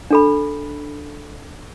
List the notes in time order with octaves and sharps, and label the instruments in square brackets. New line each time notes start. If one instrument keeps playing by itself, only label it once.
[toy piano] D4 A4 B5